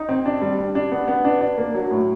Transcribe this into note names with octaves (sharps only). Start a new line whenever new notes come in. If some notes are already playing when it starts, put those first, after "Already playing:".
Already playing: D#4
C4
D4
G3
G3
D4
B3
B3
D4
D4
A#3
F#3
A2